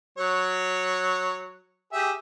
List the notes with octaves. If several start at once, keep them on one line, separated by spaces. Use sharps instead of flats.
F#3 C#5
G4 G#4 E5